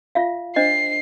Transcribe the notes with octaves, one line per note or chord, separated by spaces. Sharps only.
F4 E5 F5
D4 C5 D#5 C7